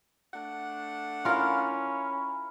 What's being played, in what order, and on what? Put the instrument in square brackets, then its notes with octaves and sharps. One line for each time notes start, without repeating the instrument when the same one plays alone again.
[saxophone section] A3 D4 F#5
[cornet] C#4 [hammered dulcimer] E4 F5 [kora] F4 A#4